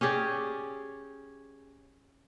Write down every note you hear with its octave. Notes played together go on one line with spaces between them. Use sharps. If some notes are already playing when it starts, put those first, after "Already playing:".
C#4 G4 G#4 D5